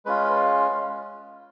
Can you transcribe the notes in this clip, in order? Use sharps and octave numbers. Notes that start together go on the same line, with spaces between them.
G#3 C#4 F4 B4